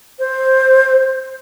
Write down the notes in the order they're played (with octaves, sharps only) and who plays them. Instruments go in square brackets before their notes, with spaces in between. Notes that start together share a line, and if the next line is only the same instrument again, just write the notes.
[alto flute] C5